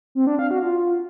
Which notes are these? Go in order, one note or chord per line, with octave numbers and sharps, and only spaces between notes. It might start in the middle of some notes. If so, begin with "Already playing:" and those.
C4
D4
F5
F#4
F4